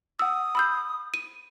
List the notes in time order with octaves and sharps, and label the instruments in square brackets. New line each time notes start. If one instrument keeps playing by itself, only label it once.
[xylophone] F#5 E6 [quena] D#6
[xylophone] B5 E6 G6
D#7